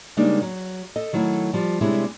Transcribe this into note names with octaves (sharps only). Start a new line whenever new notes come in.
C#3 G3 G#3 A#3 D4 D#4
F#3
A4 D#5
D#3 F#3 A3 E4
F3 G3
C3 G3 G#3 C#4 D4 E4